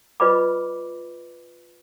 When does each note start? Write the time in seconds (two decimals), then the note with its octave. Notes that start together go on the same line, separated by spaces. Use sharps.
0.20 F4 B4 D5 D#5 B5 D6